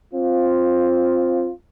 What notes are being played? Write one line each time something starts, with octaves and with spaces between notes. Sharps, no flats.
C4 F4